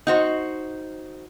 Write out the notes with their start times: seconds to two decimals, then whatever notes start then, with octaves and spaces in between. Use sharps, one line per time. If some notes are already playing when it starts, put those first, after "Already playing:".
0.07 D#4 F#4 C5